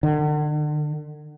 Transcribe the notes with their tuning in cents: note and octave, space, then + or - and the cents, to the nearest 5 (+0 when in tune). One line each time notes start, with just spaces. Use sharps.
D3 +40